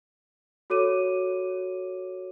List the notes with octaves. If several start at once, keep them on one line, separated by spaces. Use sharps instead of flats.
F#4 A4 C#5 D6 D#7